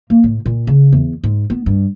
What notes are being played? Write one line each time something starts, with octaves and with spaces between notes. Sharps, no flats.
A#3
A2
A#2
C#3
E2
G#2
B3
G2